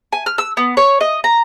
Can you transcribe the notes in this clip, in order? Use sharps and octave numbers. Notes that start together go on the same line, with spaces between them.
G#5
F6
E6
B3
C#5
D#5
A#5